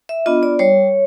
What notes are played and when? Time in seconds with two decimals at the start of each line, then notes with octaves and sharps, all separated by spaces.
0.09 E5
0.26 B3 D4 F4 D#5
0.43 D5
0.59 G3 C#5